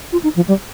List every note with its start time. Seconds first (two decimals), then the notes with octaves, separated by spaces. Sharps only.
0.12 F4
0.23 D#4
0.36 F3
0.48 G3